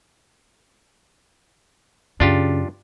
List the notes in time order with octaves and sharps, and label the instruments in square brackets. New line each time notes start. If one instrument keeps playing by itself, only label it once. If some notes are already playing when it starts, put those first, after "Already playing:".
[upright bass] F#2 [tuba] C#3 [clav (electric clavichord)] D4 F4 G4